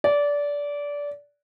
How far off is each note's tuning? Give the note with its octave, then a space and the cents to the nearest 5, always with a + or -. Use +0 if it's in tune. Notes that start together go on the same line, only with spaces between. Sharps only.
D5 -20